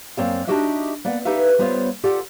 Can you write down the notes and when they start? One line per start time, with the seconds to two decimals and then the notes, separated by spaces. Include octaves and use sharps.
0.17 F#2 A#3 C4 C#5 D5 F5
0.47 D4 D#4 F#4 G4 D#5 E5
1.05 A#3 B3 D5 F#5
1.25 D#4 G4 A4 B4 E5 F5
1.59 G3 B3 F4 C5 C#5 F5
2.03 F4 G4 A4 D5 F#5